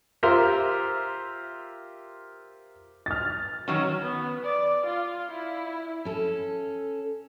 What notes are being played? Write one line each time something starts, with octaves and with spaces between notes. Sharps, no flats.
F4 G4 A#4 C5 E5 F5
F6 A6
D#3 F#3 C#4
B3
D5
F4
E4
C#4 A4